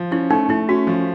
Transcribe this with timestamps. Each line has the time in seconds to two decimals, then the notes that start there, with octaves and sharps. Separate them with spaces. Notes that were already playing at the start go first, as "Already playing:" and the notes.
Already playing: F3
0.11 C#4 E4
0.30 A3 D#4
0.49 A3 E4
0.69 C#4 F#4
0.87 F3